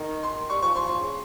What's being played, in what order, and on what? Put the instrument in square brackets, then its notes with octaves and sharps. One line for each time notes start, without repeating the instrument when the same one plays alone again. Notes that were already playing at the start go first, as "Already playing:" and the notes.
Already playing: [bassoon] D#3
[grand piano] C6
[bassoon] G3 [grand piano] C#6
[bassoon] F3 [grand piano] C#6
[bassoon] F3 [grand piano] C6
[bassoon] F3 [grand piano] C6
[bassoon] C#3